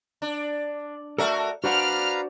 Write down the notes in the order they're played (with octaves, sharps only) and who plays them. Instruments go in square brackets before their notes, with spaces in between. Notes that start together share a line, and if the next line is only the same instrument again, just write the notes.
[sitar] D4
[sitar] A3 F#4 A#4 [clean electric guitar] A4 D5 E5
[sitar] D4 [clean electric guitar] F#4 C5 F#5 [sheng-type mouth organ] B4 F5 A#5 [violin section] F6